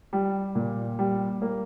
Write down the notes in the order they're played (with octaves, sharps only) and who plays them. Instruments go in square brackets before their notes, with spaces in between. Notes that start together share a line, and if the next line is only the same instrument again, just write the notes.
[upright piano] G3
A#2
G3
A#3